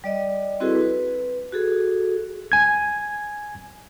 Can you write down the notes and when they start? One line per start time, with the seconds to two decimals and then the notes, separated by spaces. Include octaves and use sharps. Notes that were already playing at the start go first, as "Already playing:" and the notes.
0.04 G3 D5 D#5
0.60 C4 E4 F#4 G#4 A4 B4
0.75 B4
1.52 F#4 G#4 A4
2.52 G#5 G#6